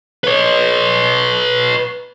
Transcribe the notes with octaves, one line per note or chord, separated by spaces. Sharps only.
B4 C#5